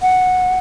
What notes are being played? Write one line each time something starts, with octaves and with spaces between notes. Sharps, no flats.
F#5